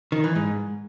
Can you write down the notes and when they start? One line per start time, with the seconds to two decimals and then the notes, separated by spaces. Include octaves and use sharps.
0.12 D#3
0.24 E3
0.35 G#2